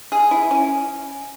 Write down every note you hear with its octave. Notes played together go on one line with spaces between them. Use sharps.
G#4
E4
C#4